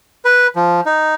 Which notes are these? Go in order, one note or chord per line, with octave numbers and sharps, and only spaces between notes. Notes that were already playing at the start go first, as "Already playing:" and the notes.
B4
F3
D#4